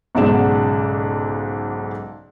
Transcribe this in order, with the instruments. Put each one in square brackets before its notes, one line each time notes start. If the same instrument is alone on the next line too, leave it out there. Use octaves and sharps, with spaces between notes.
[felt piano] B1 G#2 C#3 D5 F#5 E7